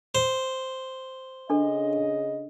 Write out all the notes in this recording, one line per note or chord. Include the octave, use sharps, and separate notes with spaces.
C5
C#3 D4 A4 D#5